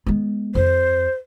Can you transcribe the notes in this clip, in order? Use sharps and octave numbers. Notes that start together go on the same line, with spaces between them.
G#3 B3
F2 C5